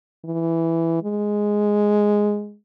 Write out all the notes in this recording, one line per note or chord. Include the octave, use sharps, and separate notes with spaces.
E3
G#3